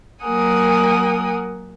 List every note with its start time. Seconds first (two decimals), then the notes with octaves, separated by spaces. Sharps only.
0.23 F#3 A#3 A#4 F#5 G#5 D#6